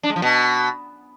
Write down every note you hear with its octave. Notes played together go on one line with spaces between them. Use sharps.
D4
G#3
F3
B2